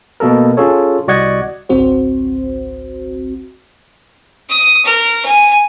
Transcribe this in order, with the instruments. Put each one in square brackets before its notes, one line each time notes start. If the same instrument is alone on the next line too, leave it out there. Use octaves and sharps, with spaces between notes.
[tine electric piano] B2 A#3 A4 A#4
C#4 F4 G#4 A4 C#5
C2 F#4 D5 D#5 F#5 G#6
[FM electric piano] G#1 C#2 C4 F#4 C5
[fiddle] D#6
A#4
G#5